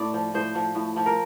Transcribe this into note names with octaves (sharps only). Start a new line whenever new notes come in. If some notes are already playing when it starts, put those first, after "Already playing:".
Already playing: A2 D5
F3
A2 C5
F3
A2
F3
A#4